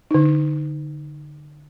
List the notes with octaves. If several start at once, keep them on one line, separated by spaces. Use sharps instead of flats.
D3 D#4